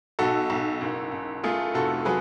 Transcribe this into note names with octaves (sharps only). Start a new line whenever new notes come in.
B1 F#4 A4
B1
F#1
F#1
A3 F4 G#4
F1 F#4 A4
F#3 G#4 B4